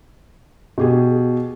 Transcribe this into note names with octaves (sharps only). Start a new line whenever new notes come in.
B2 G4 G#4